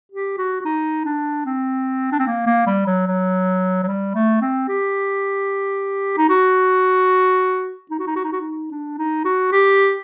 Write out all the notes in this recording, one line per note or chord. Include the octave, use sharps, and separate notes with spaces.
G4
F#4
F#4
D#4
D4
C4
D4
C4
A#3
A#3
G3
F#3
F#3
F#3
G3
A3
C4
G4
D#4
F#4
D#4
F#4
D#4
F#4
D#4
F#4
D#4
D4
D#4
F#4
G4